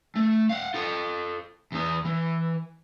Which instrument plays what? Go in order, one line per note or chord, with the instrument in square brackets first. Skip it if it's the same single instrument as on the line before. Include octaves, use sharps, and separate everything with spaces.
[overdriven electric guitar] A3
F5 F#5
F4 A4
E2 B3
E3